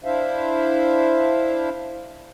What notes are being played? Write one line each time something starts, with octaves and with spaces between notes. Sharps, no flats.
D4 E4 C5 E5 F5